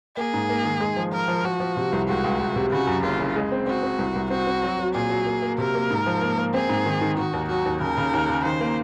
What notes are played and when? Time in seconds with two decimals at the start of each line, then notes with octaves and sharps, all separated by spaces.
0.17 A#3 G#4
0.34 G#2
0.49 A#3
0.64 D#3
0.80 G#3
0.96 F3
1.12 F3 A#4
1.28 F3
1.44 F3 F#4
1.60 F3
1.77 C3
1.92 C2
2.08 C#2 F#4
2.24 C#2
2.40 C#2
2.56 C3
2.72 C#3 F#4
2.87 F#2
3.03 F#1 F4
3.19 C#3
3.36 G#3
3.52 C4
3.67 C4 F#4
3.83 C4
3.98 C2
4.15 C2
4.30 C4 F#4
4.47 C4
4.63 F#3
4.79 F#3
4.95 A#2 G#4
5.10 F#3
5.26 A#3
5.42 A#3
5.58 C3 A#4
5.75 A#3
5.91 G#2
6.06 F3
6.22 A#3
6.38 A#3
6.54 C4 G#4
6.69 G#2
6.86 D#3
7.01 D#3
7.17 D#3 F#4
7.33 D#2
7.49 F#3 F#4
7.66 D#2
7.81 C#3 A#4
7.98 C#3
8.14 D#2
8.29 C#3
8.44 D#3 C5
8.60 A#3